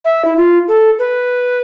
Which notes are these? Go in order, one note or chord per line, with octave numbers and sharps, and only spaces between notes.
E5
E4
F4
A4
B4